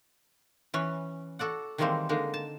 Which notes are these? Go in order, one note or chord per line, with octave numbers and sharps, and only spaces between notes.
E3 C#4 B4
F#4 A4 D5 F#5
D#3 E3 G3 G#3 A#3 C4
D3 G#3 A#3 D#4
A5